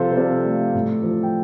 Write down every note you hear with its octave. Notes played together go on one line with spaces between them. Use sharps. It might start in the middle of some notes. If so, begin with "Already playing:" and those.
Already playing: C3 F3 A4 C5 F5
C5
C3 A4 D5
A3
A2
F3
G5